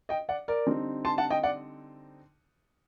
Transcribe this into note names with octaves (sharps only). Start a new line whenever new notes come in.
D#5 G5
D5 F#5
A#4 D5
D3 G3 C4 D#4
A5 C6
F#5 A5
D#5 G5
D5 F#5